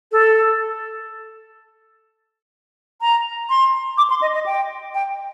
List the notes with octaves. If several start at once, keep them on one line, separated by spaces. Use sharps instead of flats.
A4
A#5
C6
D6
C6
D#5
D#5
G5
G5